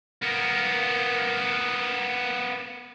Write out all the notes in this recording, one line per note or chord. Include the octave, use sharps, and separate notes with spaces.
A#3 B3